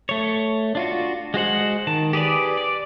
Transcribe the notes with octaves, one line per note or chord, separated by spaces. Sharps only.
A3 C#5
D4 F4 F#4
G#3 F#4 C5 F#5
D#3 A5
G4 G#4 B4 D5
D5